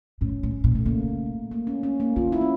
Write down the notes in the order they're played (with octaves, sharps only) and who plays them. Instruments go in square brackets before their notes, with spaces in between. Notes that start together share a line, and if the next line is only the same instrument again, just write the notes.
[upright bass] A2 [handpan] C#4
[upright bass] A2
A#2
[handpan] A3
[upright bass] C#3 [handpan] A#3
[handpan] A#3
C#4
C#4
A#3
[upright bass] D3 [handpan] F4
[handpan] E4
C#4